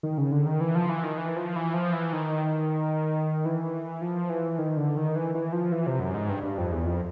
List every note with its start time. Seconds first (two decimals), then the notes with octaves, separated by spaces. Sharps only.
0.03 D#3
0.18 C#3
0.32 D3
0.46 D#3
0.61 E3
0.75 F3
0.89 E3
1.03 D#3
1.18 E3
1.36 F3
1.56 E3
1.74 F3
1.93 E3
2.13 D#3
3.45 E3
4.01 F3
4.29 E3
4.58 D#3
4.77 D3
4.97 D#3
5.16 E3
5.35 E3
5.53 F3
5.72 E3
5.87 C3
6.00 F#2
6.14 G#2
6.29 G2
6.43 G2
6.58 F2
6.71 E2
6.86 F2